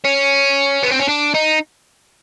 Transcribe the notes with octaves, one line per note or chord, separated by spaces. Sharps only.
C#4
B3
C4
C#4
D4
D#4